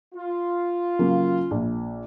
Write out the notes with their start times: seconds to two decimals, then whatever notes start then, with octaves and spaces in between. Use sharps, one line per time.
0.15 F4
0.99 C#3 F#3 A#3
1.51 A#1